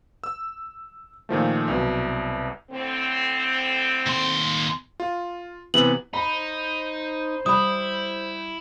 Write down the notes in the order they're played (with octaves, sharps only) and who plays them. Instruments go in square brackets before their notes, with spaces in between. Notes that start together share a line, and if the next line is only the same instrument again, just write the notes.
[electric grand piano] E6
A#2 D#3 F3 A3
C2 B2 F#3
[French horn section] A2 D3 C4
[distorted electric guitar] D#2 C6
[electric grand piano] F4
[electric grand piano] C3 E3 B3 [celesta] F#7
[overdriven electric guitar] D#4 [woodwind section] C5 [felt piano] B5
[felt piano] G3 [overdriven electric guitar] E4 [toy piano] B5 D#6